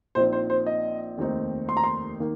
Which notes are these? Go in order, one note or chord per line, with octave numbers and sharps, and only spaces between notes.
A#1 A#2 F3 C4 D#4 C5
C5
C5
D#5
F1 D#2 D#3 C4 D#4
C6
A#5
C6
D#3 A#3